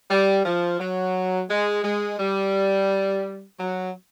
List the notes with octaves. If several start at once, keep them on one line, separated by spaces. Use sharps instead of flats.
G3
F3
F#3
G#3
G#3
G3
F#3